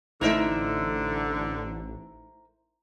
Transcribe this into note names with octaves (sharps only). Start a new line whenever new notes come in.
A1 D3 A3 D#4 E4 A#4 C5 E5